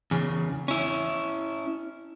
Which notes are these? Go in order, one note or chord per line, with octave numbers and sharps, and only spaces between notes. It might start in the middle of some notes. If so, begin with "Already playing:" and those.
E2 C#3
C#4 E4